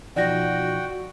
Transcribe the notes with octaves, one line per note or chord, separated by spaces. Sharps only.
B2 F3 D#4 F#4 D5 F#5 G5 A#6